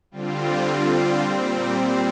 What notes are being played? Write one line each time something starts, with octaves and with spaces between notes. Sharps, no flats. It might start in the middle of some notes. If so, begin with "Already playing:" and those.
D3 G3 C4 F4
A#2 G3 C4